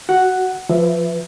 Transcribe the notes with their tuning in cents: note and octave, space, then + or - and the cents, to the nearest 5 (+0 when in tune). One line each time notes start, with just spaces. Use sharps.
F#4 +10 F#5 +0
F3 +0 B4 +15 E5 +0